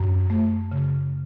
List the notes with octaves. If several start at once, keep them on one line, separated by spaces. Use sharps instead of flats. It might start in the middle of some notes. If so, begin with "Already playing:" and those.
Already playing: F#2
A3
C#3